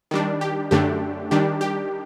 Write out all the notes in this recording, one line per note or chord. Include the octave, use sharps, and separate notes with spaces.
D#3 G3 D4
G4
F#2 D3 A3 D4 G4
D#3 G3 D4 G4
G4